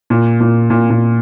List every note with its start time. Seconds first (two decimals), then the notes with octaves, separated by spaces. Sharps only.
0.10 A#2
0.40 A#2
0.70 A#2
0.90 A#2